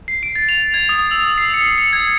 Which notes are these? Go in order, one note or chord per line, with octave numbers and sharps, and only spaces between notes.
C7
D7
A6
F7
G#6
D#6
E6
C7
C#7
C#7
G#6